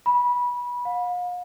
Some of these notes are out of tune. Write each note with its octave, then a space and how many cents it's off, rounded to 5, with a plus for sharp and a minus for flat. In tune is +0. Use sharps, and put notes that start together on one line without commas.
B5 -20
F5 +40